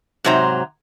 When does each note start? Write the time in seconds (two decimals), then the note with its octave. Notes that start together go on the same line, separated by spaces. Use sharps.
0.24 G#2 C3 F#3 C5 A#5